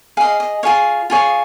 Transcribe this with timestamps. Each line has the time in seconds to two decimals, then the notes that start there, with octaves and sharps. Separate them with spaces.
0.17 G#4 D#5 F5
0.40 D#5
0.63 F4 G#4 C#5 F5
1.10 F4 G#4 C#5